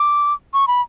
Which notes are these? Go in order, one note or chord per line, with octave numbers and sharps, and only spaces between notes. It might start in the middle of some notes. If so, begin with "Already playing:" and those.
Already playing: D6
C#6
B5